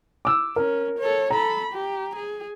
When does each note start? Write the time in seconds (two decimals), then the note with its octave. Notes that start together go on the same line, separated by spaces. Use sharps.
0.25 D6 E6
0.56 C#4 A#4
0.99 A4 C#5
1.30 A4 A#5 B5
1.73 G4
2.16 G#4